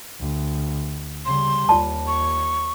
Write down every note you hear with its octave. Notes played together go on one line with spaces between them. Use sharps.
D2
C#3 G3 C6
D#2 F4 D5 A5
C#6